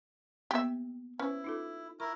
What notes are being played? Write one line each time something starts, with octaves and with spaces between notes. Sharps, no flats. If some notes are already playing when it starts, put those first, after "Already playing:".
A#3 B3 G4 E5
C#4 E4 B4 C5
D#4 F4 A4
E4 A#4 C#6